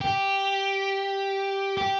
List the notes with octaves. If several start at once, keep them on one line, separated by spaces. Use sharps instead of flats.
G4
G4